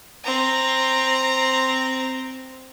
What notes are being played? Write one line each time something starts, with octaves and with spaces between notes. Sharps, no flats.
C4 A#5